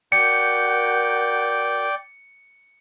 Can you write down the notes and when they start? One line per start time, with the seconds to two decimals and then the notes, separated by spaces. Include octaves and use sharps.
0.12 F#4 A#4 D5 G5 G6 C#7